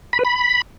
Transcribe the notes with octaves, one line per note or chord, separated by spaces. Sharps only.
B5
B4
B5